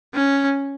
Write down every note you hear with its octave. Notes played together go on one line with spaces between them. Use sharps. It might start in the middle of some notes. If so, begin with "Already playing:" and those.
C#4